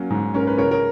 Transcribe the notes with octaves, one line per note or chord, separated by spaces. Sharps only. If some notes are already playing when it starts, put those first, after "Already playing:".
Already playing: F#3 A#3 C#4
G#2
C#4 A#4
B4
C#3 A#4 C#5
A#4